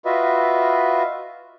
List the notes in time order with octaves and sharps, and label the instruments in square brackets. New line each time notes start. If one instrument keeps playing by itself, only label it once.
[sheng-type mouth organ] F4 F#4 B4 D#5 E5